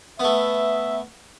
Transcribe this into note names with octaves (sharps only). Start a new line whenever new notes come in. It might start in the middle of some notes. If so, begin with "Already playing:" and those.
A3 B3 E5